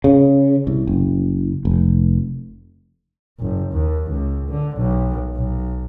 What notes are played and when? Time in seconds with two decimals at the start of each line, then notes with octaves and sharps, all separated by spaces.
0.04 C#3
0.67 C2
0.87 F#1
1.65 F1
3.40 F#1
3.72 D#2
4.11 C#2
4.49 D3
4.77 B1
5.36 B1